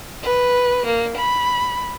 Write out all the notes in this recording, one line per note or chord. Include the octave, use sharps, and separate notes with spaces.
B4
A#3
B5